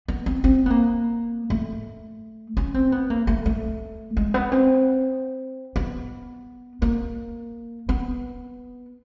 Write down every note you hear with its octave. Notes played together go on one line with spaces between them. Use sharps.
B3
C4
C4
B3
A#3
A3
C#4
C4
B3
A#3
A3
A3
G#3
B3
C4
B3
A#3
B3